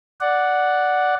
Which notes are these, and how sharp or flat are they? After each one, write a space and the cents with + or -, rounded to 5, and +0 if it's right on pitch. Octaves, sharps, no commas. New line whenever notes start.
D5 +0 F#5 +0